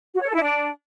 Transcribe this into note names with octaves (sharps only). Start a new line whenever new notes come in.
F#4
C#5
A4
E4
D4